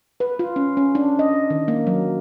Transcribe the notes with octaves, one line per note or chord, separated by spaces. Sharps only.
B4
F4
C#4
C#4
D4
D#5
D#3
A#3
F#3